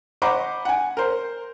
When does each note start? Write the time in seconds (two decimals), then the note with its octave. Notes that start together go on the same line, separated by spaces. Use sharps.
0.22 C5 D#5 F#5 A#5 B5 D6
0.65 F#5 G#5
0.97 A#4 C5